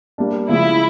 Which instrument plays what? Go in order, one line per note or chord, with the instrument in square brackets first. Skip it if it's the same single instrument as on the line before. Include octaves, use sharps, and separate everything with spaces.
[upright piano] G3 A#3 D4
[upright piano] C#3 F3 G#3 [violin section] E4